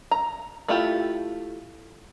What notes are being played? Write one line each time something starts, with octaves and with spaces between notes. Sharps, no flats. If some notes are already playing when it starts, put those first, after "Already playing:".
A#5
A3 E4 F4 G4